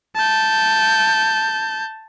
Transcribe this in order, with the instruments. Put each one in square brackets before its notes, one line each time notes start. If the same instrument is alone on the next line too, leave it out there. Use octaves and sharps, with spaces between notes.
[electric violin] A5 G6